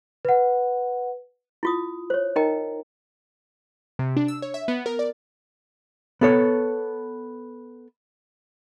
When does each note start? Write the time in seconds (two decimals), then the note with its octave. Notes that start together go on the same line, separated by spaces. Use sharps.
0.25 B4 F#5
1.63 E4 F4 D#6
2.10 C5 C#5
2.36 D#4 A#4 D#5 G5 A#5
3.99 C3
4.17 D4
4.28 E6
4.42 C#5
4.54 E5
4.68 B3
4.86 A#4
4.99 D5
6.21 B3 A4 C#5